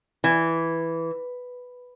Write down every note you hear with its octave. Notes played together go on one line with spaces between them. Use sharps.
E3